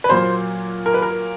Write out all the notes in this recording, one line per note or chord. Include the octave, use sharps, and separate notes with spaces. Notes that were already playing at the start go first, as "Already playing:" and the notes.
B4
A#2 F#3 A#3 C5
A#4
B4
A#4